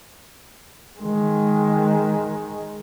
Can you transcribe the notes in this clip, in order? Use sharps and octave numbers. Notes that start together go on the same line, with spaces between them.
D#3 G#3